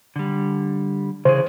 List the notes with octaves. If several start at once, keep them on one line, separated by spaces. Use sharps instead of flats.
D3 G3
C#3 E3 G#4 C5